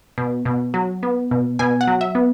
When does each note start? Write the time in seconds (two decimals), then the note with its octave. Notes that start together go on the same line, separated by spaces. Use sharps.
0.18 B2
0.45 B2
0.74 F#3
1.03 B3
1.31 B2
1.59 B2 G#5
1.81 F#5
1.87 F#3
2.01 E5
2.15 B3